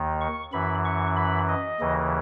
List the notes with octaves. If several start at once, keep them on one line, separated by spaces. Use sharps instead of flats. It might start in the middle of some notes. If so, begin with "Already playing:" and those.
Already playing: D#2 D#3
C#6
F#2 E3 B5
C#6
B5
D#5
D#2 C#3 E3